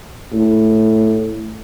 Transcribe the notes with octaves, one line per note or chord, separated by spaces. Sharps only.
A2